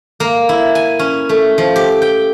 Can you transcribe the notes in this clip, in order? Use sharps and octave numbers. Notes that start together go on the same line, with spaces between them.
A#3
E4
G#5
C#4
A3
F3
G4
G5